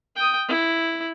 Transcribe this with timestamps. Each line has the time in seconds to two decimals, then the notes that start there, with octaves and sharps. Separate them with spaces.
0.16 G5 D#6
0.48 E4